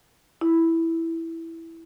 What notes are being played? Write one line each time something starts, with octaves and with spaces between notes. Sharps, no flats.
E4